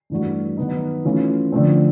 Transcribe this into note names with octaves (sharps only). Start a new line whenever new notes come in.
G2 E3 A3 D4 F#4
D#3 F#3 B3 D#4
E3 A3 C#4 F4
D3 F3 A3 C4